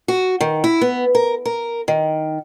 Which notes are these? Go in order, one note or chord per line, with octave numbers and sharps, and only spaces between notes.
F#4
D#3
E4
B3
A#4
A#4
D#3